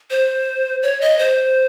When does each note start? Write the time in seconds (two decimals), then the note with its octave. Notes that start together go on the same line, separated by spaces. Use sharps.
0.11 C5
0.83 C#5
1.01 D#5
1.19 C5